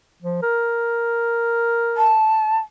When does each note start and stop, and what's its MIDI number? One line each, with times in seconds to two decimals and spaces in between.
0.22 0.40 53
0.42 2.15 70
1.97 2.58 81